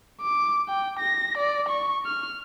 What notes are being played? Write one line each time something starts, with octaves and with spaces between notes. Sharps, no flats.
D6
G5
A#6
D5
C#6
F6